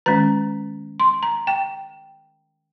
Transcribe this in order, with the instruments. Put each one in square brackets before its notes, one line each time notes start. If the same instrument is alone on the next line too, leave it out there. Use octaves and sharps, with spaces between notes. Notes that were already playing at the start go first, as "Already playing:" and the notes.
[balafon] D#3 G#3 C#4 A#5
C6
A#5
G5